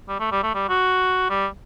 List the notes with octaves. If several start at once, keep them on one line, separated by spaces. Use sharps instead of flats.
G3
A3
G3
A3
G3
F#4
G3